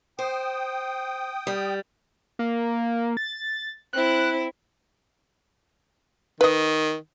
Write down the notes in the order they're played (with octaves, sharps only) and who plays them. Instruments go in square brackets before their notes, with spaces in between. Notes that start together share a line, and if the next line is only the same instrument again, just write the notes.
[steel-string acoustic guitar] C5 [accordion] G5 D#6
[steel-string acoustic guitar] G3
[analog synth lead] A#3
A6
[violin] C4 E4 [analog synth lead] F#6
[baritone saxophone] D#3 [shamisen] B4 D#5